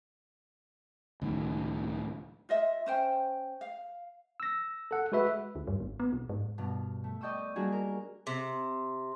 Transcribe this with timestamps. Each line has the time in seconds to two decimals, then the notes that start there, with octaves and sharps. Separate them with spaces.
1.22 C#2 A2 D#3
2.49 F4 D#5 E5
2.86 C#4 C5 G5
3.61 F5
4.40 E6 A#6
4.91 A4 F#5
5.12 G#3 F#4 B4 E5
5.55 D2
5.67 G2
5.80 G#1
6.00 B3
6.12 B1
6.29 G#2
6.58 G2 B2
7.04 A3
7.21 D5 D#5 G5 C#6 D#6 E6
7.56 G3 A#3 D4 F#4 G#4
7.72 A#4
8.27 C3